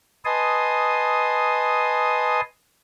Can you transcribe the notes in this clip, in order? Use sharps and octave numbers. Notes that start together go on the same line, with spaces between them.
B4 D#5 G#5 A5 C6 D#6